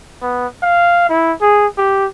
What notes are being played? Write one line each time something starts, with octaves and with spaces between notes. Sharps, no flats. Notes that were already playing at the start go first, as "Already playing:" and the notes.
B3
F5
E4
G#4
G4